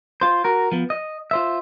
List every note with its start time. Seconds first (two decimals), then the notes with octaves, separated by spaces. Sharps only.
0.21 F4 C5
0.45 F#4 A#4
0.72 F3 B3
0.90 D#5
1.31 F4 C5 E5